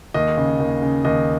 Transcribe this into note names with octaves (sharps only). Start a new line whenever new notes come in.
D#2 D#5
C#3
D#2
C#3
D#2 D#5